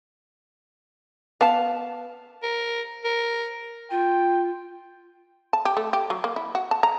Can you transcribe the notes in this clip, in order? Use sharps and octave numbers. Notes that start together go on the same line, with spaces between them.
B3 F5 A5
A#4
A#4
F4 G5
A5
G4
A3
G4
F#3
A#3
E4
F#4
A5
A#5